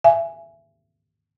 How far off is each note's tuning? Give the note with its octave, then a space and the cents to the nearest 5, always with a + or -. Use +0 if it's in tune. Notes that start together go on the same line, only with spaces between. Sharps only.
E5 +25 G#5 +0